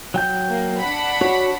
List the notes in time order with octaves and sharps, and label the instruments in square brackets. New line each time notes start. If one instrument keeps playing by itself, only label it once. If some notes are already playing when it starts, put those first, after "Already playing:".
[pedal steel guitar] F#3 G5 G6
[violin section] A#3
D4 F#5 B5
[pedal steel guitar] F#4 C#5